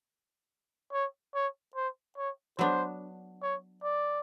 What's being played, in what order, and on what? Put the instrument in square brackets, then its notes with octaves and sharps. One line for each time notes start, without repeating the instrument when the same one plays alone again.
[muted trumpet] C#5
C#5
C5
C#5
[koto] F#3 B3 D4 [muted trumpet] C5
[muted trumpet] C#5
D5